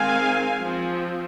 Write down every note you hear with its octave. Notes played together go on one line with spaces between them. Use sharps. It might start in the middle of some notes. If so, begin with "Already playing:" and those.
Already playing: D#3 G#3 C4 F5 G#5
F3 C4